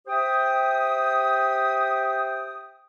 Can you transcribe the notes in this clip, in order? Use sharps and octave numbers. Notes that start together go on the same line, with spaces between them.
G4 C5 E5 G5 D#6